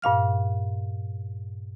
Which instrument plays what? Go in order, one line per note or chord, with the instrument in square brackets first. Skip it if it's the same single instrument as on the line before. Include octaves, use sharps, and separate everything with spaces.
[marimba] G2 A#2 F5 F6